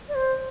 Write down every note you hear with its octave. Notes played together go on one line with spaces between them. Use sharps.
D5
C5